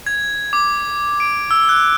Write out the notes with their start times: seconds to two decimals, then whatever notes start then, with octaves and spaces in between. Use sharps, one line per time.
0.06 G#6
0.53 D6
1.20 D7
1.51 E6
1.69 F#6